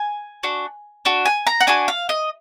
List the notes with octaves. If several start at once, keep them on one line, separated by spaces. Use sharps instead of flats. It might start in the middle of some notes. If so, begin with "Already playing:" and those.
Already playing: G#5
D4 F#4
D4 F#4
G#5
A#5
F#5
D4 F#4 G#5
F5
D#5